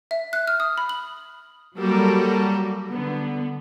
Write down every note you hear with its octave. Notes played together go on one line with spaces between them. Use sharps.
E5
F#6
F6
D#6
B5
F#7
F#3 G3 A#3 F#4 A4 A#4
D3 B3